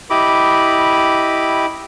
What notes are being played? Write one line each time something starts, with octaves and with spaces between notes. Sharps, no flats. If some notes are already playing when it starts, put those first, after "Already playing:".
E4 G4 D#5 B5 D6